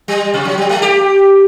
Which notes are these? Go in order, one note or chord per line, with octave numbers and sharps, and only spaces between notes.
G3
C3
F#3
G3
A3
G4